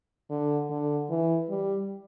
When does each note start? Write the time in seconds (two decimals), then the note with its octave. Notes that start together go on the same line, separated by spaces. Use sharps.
0.30 D3
0.69 D3
1.10 E3
1.50 G3